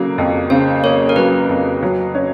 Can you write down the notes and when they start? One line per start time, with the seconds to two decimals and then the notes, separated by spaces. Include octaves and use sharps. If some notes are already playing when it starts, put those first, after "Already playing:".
Already playing: C#3 F#3 A#3 A4
0.18 F2
0.50 C#3 C5
0.83 A#3 C#5
1.09 A#4
1.16 F#3 B4
1.49 F2
1.83 F#3
2.14 C#4